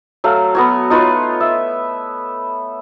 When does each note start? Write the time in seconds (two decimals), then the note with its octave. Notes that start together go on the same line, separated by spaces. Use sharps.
0.24 F#3 A3 F5
0.55 B3 F#4 C#5
0.90 D#4 F4 B4 C#5
1.41 E5